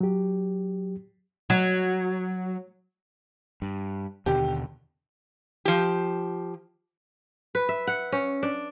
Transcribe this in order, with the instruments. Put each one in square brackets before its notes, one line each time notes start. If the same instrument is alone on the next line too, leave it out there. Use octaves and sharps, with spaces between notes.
[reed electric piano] F#3 G4
[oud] F#3
[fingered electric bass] G2
[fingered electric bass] D#2 B2 D3 [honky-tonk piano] G4
[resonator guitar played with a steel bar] F3 G4
[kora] B4
E5
F#5
C#4
D4